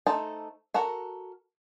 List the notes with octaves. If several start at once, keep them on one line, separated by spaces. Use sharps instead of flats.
A3 D#4 A4 C5 A5
F#4 A4 A#4 F#5